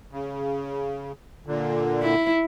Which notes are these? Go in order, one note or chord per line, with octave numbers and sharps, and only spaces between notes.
C#3
A#2 D3
E4